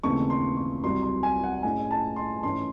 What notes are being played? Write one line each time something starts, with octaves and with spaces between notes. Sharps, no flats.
D#2 C#3 E3 A3 C4 C#6
C6
C#6
C2 C3 F#3 C6
C6
G#5
F#5
A2 G#3 C#4 G#5
A5
C6
G#2 E3 A3 C#4 C6